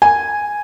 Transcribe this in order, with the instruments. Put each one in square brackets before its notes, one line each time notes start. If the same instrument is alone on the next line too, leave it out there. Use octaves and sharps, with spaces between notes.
[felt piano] G#5